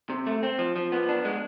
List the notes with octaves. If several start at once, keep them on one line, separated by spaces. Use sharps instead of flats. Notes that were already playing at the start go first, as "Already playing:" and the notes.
C3
A3
C4
F3
F3
B3
D4
G#3